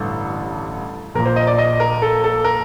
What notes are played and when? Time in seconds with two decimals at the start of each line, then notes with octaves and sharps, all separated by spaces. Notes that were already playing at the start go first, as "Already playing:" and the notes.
Already playing: A1 G2 D3 A4
1.15 A#1 A#2 A#4
1.25 C5
1.36 D#5
1.47 D5
1.58 D#5
1.80 A#4
2.02 A4
2.24 A4
2.44 A#4